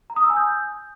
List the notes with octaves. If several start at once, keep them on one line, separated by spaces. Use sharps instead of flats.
A#5
D#6
E6
G#5
G6